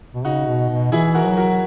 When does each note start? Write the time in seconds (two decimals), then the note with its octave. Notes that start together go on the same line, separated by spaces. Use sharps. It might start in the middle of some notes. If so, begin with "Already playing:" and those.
0.14 B2
0.24 C#3 D#4 F#4
0.47 B2
0.69 B2
0.92 E3 E4 G#4
1.15 F#4 A#4
1.26 F#3
1.37 F#4 A#4